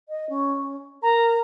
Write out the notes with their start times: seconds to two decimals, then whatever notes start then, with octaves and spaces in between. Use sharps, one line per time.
0.09 D#5
0.29 C#4
1.02 A#4 A#5